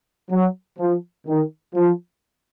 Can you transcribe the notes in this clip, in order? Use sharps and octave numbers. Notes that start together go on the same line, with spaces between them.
F#3
F3
D#3
F3